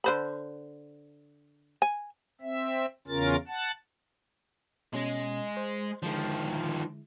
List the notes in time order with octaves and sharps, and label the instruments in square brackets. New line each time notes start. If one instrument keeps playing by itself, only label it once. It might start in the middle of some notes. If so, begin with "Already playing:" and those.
[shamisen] D3 C5 B5
G#5
[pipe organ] C4 E5
E2 C#3 C#4 F4 A#4 A6
F#5 A5
[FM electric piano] B2 C#4 A#6 [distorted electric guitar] G#3
[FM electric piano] C5
[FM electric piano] D3 G#3 E4 [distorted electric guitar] D#3 F3